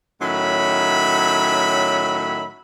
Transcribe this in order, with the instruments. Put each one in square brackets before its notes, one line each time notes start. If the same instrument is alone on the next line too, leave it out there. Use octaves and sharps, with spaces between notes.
[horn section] A2 D#3 F#3 C#4 E5 B5